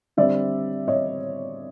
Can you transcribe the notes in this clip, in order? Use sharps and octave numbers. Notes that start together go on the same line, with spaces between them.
D3 G3 C4 D5 E5
C#5 D#5